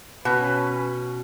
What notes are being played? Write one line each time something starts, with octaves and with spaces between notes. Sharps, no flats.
B2 C#4 B4